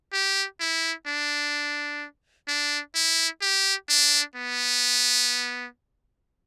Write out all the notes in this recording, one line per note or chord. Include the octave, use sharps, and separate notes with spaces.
G4
E4
D4
D4
E4
G4
D4
B3